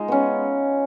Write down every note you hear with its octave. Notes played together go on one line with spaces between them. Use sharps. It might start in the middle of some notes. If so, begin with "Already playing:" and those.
Already playing: G#3 D#4 F4
B3 C#4